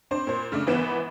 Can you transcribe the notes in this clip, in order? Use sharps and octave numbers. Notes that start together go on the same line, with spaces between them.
C4 D4 C5
A#2 C5
C#3 A3 D4
G#1 E3 B3 B4 E7